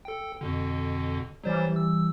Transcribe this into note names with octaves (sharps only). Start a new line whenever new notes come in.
A4 G5
F2 B2 D3
E3 F#3 G3 C5 A6
E6